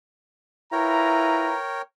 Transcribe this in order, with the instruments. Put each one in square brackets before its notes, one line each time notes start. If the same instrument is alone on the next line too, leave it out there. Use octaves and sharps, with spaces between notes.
[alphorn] E4 [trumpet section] F4 B4 A#5 [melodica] A#4 C#5 G5